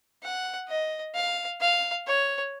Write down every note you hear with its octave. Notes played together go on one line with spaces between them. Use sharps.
F#5
D#5
F5
F5
C#5